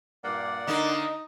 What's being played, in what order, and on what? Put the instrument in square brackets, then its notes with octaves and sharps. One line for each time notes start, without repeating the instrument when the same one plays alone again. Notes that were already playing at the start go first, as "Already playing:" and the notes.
[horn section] G2 A#2 A#3 [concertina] D5 F#5
[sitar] D3 A#3 [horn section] D#4